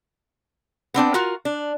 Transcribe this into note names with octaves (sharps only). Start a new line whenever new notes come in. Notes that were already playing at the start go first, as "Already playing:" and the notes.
B3 C4 D4 G5
F4 F#4 A#4
D4